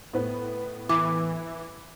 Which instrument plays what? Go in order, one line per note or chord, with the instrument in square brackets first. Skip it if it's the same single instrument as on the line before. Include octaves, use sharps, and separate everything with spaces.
[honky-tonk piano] A2 B3 B4
[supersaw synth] E3 [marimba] D6